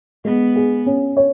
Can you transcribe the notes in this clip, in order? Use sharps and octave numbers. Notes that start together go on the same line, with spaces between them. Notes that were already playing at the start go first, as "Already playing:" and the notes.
G#3 B3
G#4
C#4
C#5